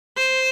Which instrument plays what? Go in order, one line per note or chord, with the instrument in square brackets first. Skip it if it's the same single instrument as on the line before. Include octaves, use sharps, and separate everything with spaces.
[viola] C5